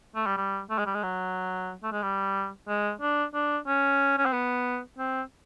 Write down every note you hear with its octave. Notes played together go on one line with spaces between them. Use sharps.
A3
G3
G3
A3
G#3
G3
G#3
F#3
A3
G#3
G3
G#3
D4
D4
C#4
C#4
C4
B3
C4